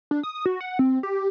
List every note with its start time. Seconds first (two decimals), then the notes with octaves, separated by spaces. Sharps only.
0.11 D4
0.23 D#6
0.46 F#4
0.61 F#5
0.79 C4
1.03 G4